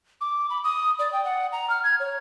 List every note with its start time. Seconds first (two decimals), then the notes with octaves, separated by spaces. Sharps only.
0.21 D6
0.50 B5
0.64 D#6
0.99 D5
1.13 G5
1.25 F#5
1.52 A#5
1.70 F6
1.84 G#6
2.00 C#5